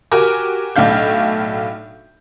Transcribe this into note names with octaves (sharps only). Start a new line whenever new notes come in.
F#4 G4 A#4 G#5 D6
B1 A2 D4 F5 G6